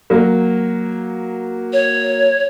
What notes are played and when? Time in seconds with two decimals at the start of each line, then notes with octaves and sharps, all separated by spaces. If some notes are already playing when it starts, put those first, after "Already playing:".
0.10 F#3 A#3
1.73 C#5